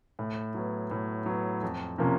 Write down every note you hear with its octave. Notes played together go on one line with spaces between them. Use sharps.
A2
F#3 B3
A2
F#3 B3
F2
C3 F3 A#3 C#4